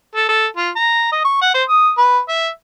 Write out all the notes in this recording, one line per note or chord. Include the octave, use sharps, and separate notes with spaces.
A4
A4
F4
A#5
D#5
C#6
F#5
C5
D#6
B4
E5